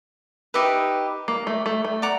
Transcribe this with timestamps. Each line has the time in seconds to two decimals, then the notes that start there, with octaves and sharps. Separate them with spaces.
0.54 D#4 G4 B4 E5
1.28 A#3
1.47 A3
1.66 A3
1.85 A3
2.02 D5 F#5 A#5